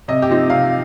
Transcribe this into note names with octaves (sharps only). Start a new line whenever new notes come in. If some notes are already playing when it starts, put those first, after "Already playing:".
C3 D#5
G4
F3 C4 D#4
C3 F5